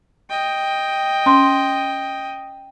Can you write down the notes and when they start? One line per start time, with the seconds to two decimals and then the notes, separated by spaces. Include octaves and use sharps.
0.30 D#5 G5
1.26 C#4 C6